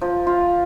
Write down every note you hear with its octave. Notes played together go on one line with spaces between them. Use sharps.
F3
F4